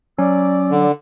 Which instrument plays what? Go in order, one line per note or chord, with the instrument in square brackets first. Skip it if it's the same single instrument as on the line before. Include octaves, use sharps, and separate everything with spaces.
[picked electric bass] F#3 [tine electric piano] C#4 [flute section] D5 D6 E6
[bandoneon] D3